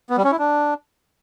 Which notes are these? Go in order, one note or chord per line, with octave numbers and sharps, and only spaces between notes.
B3
G3
C#4
E4
D4